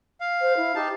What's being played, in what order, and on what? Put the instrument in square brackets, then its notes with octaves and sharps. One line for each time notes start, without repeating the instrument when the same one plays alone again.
[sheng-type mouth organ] F5
[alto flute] C5
E4
[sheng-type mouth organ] D#4 A5 [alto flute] G4